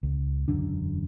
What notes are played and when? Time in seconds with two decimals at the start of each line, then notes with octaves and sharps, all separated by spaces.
0.03 C#2
0.48 E1 F#2 D3 D4